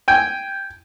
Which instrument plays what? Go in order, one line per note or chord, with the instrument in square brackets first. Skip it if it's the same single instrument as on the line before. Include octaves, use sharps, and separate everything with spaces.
[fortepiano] G5 G#5